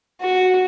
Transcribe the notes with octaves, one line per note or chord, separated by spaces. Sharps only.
F#4